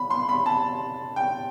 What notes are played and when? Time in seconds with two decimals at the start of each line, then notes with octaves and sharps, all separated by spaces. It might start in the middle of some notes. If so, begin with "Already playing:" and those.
Already playing: B5
0.10 C6
0.29 B5
0.46 A5
1.16 G5